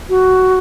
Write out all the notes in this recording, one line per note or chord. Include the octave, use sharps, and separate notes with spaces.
F#4